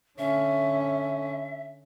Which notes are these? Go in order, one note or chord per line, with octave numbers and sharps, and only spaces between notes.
D3 C#4 E5